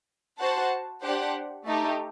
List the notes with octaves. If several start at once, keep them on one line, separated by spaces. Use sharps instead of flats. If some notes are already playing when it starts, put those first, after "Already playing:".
F#4 C5 F#5 A5
D4 G4 C5 F#5
A3 D#4 G4